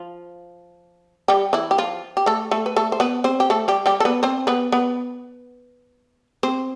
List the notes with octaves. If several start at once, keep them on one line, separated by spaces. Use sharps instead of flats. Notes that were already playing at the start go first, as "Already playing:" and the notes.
Already playing: F3 F4
G3 G4
E3 E4
G4
F3 F4
G4
A3 A4
A3 A4
B4
A3 A4
C5
B3 B4
C4 C5
G4
A3 A4
G3 G4
G3 G4
A4
B3 B4
C4 C5
B3 B4
B3 B4
C4 C5